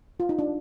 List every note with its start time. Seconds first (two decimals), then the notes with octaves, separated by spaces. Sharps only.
0.20 F4
0.29 D#4
0.39 D4